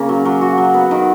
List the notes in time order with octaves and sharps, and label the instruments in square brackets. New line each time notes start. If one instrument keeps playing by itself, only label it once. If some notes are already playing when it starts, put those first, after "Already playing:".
Already playing: [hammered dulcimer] C#3 A#3 C#4
F#3
F#3
F#4
F#3
B3
D#3